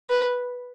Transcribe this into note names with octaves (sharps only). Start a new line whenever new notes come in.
B4